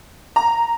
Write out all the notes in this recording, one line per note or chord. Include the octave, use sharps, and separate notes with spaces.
A#5